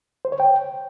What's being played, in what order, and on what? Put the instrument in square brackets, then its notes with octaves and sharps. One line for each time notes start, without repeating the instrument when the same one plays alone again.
[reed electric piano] C5
C#5
G5